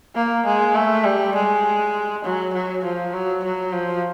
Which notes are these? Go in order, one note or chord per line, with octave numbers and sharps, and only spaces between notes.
A#3
G#3
A3
G3
G#3
F#3
F#3
F3
F#3
F#3
F3